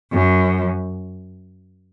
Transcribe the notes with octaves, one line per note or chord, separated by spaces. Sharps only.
F#2